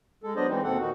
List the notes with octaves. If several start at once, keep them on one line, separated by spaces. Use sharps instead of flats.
G#3 A4
F#3 B3 D4 C5 D5 D#5
E3 G#3 C4 D#4
D#2 B2 C4 A4 F#5
A#2 D#3 D#4 F#4